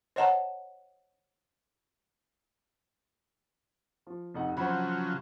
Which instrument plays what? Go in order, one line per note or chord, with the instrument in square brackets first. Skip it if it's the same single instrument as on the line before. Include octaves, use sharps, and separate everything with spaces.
[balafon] C5 C#5 D#5 F#5 A5 A#5
[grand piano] F3
F1 D#4 F#5
[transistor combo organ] C#3 F3 F#3 [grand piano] C5 F#5 B5